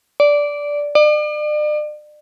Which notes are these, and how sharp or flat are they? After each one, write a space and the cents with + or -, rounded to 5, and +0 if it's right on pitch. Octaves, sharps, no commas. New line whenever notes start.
D5 -10
D5 +40